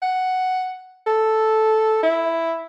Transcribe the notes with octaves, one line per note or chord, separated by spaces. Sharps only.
F#5
A4
E4